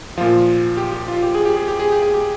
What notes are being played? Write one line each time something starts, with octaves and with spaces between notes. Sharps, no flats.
A#2 F3 F4
G4
G4
F4
G4
G#4
G4
G#4
G4
G#4
G4
G#4
G4